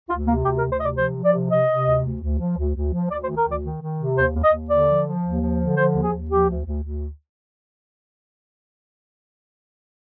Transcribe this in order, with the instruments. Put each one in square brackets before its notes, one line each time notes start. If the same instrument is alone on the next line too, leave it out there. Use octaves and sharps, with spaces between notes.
[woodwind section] D2 F4
C3 A#3
D2 G4
A#4
D2
C5
C3 D#5
D5
F3 C5
F3
D5
C3
C3 D#5
C3
D2
D2
D2
F3
D2
D2
F3
D2 D5
C5
D#3
A#4
D2 D5
D#3
D#3
C3
D#2 C5
D#2
D#5
D#2
D3 D5
F3
F3
D#2
F3
D3
F3 C5
D#2
G#4
D#2
F3 G4
D2
D2
D2